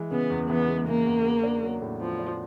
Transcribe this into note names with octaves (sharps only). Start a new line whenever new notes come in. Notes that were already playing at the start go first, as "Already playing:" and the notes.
Already playing: E3 G#3
C#3 B3
E2
E3 B3
G#3
C#3 A#3
E2
B3
D4
F#3
A2
F3 B3
D4